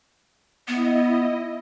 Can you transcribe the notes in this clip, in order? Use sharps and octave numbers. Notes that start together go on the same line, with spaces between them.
B3 E4 D#5